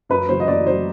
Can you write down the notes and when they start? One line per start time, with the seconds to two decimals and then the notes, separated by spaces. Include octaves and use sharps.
0.09 F#2 B4
0.28 C#3 F#3 C5
0.40 D#5
0.48 F#2 D5
0.66 C#3 F#3 C5